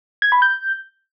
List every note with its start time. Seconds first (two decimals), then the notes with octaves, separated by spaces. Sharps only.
0.22 G#6
0.32 B5
0.42 G6